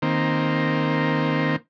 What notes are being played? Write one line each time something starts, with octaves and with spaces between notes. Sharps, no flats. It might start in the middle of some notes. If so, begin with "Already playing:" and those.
D#3 A#3 C4